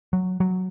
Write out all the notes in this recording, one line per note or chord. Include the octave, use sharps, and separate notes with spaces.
F#3
F#3